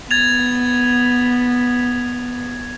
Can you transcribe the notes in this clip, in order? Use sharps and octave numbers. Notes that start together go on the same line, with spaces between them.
B3 G#6 A6 F7